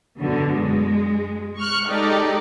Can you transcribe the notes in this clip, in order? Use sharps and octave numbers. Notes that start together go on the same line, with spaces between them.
F#2 B2 D3
G#3
C#6 F6 F#6
G#3 D#4 G4 A4 D5